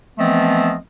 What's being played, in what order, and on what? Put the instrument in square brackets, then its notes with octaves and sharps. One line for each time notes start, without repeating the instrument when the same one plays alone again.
[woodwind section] E3 F3 A3 B3 C4 D#5